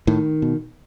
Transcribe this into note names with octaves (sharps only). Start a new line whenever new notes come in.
A2 D#3
B2